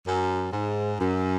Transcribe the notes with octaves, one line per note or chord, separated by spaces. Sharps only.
F#2
G#2
F#2